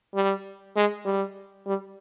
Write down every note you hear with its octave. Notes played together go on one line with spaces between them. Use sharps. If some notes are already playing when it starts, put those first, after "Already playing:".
G3
G#3
G3
G3